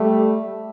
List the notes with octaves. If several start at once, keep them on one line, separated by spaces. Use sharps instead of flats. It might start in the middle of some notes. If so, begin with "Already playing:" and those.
Already playing: G3 A3